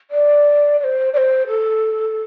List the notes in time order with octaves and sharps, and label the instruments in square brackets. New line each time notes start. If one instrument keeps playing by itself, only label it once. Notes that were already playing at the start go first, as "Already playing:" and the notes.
[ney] D5
D5
C5
D5
C5
A4